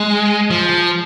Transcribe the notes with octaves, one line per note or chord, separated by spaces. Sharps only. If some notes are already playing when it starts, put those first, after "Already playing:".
Already playing: G#3
F3